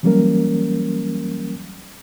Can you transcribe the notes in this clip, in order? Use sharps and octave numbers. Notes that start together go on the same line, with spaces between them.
E3 F#3 G3 A#3 C#4 A#4